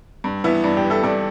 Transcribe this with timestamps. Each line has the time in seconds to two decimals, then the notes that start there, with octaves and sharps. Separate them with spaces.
0.24 G2
0.44 E3 B3 E4
0.64 G2 D4
0.77 D4 G4
0.84 E3
0.90 E4 A4
1.03 G2 A4 D5